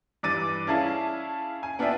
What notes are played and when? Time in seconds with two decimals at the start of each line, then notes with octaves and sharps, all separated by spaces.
0.23 G2 E3 D6 A6 D#7
0.67 C#4 D4 E4 G#4 F5 A5
1.63 G#5
1.79 B3 D4 F4 D5 E5 G5